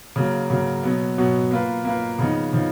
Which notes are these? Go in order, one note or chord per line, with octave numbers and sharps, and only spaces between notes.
C#3 F#3 A#3
C#3 F#3 A#3
B2 F#3 B3
B2 F#3 B3
A#3 F4 B4
A#3 F4 B4
C#3 F3 B3 D#4
C#3 F3 B3 D#4